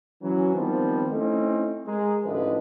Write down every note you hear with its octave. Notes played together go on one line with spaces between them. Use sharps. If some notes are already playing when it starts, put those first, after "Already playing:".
E3 F#3 C#4
D#3 F3 G3 B3 C4
A3 C4 C#4 D#4 E4
G#3 G#4 A#4
A1 D3 F3 E4 B4 D#5